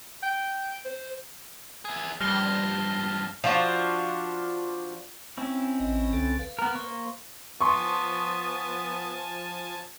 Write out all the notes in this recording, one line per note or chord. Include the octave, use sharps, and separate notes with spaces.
G5
C5
E4 G#4
G2 F3 G3 F6 A#6 G7
F3 D4 F4 F#4
C4 C#4 E4
A1 D#5
C2 D3 A4
B4 F5
B3 A#4
A#3 C5 C#6
F3 B3 G#5 A5 C6 C#6 D#6